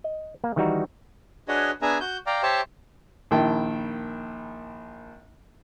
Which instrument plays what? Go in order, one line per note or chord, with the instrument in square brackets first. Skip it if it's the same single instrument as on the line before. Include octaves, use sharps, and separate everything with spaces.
[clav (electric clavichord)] D#5
A#3
D#3 E3 G3 D#4 F#4 A#4
[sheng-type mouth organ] D4 F#4 G#4 B4 C#5 D#5
B3 D4 G#4 E5 G#5 A#5
F#4 G6
D5 F5 G5 A#5
G4 C5 C#5 E5 G5 A5
[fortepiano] A#1 D#3 E4 G5 A5